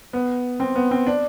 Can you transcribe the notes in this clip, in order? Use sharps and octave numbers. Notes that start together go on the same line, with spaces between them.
B3
C4
B3
C4
D4